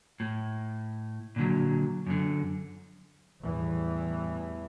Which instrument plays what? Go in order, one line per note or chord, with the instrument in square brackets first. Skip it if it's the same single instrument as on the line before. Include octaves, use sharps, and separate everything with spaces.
[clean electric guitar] A2
A#2 D3 F#3
F#2 D3
[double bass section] E2 A2 E3 G3